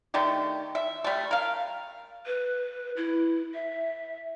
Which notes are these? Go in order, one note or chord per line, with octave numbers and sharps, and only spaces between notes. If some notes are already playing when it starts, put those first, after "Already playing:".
D3 D#3 A3 G4
E5
G3 A3
A#4 F5
B4
E4
E5